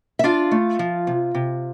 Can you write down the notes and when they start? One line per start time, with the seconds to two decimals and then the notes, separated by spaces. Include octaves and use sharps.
0.19 E5
0.24 D4 F4 F5
0.51 A3
0.79 F3
1.07 C3
1.34 C3